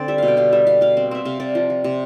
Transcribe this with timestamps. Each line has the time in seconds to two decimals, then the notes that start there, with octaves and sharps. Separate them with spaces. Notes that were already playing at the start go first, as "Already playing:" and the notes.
Already playing: D3 C4 C5 D5
0.08 G3 E5
0.18 B2 F5
0.28 G5
0.37 G3 F5
0.52 G3 E5
0.67 B2 F5
0.81 B2 F5
0.97 C4
1.11 C4 E5
1.25 C3 F5
1.40 C3 D5
1.55 F3
1.70 F3
1.84 C3